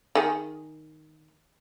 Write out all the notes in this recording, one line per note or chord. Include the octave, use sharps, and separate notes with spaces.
D#3 G#4